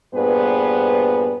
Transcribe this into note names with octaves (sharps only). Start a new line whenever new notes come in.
G2 A#2 B3 G#4 B4 C5